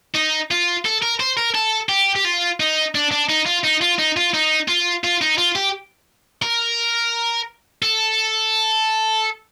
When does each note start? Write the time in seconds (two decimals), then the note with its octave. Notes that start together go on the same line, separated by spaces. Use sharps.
0.15 D#4
0.51 F4
0.85 A4
1.02 A#4
1.20 C5
1.37 A#4
1.55 A4
1.89 G4
2.16 G4
2.25 F4
2.60 D#4
2.95 D4
3.12 D4
3.30 D#4
3.46 F4
3.64 D#4
3.82 F4
3.99 D#4
4.17 F4
4.34 D#4
4.68 F4
5.04 F4
5.22 D#4
5.38 F4
5.56 G4
6.43 A#4
7.82 A4